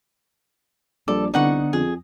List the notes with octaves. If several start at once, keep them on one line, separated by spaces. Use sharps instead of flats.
A#1 G3 A4 D5 D6
C2 D3 B3 D4 D#4 F#5 C#6
F2 G#4